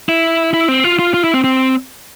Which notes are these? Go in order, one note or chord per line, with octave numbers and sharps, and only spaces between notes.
E4
E4
C4
F4
F4
F4
E4
C4
C4